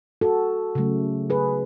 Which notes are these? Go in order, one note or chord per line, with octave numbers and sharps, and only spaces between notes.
F#4 A4
C#3 F#3 A3
G#4 B4